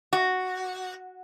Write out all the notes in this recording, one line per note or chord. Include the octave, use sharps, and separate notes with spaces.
F#4